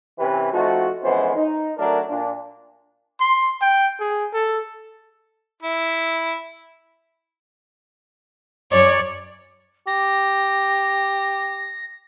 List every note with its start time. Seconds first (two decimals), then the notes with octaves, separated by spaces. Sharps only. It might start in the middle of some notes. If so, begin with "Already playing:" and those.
0.19 C3 E3 C#4 G4 B4
0.53 F3 A3 C4 D#4 F#4
1.03 F2 E3 G#3 B3 C#4 C5
1.36 D#4
1.77 F#3 A3 D4 A#4
2.09 A#2 D4
3.20 C6
3.62 G5
4.00 G#4
4.33 A4
5.63 E4
8.71 F#2 C#5 D5
9.87 G4 A#6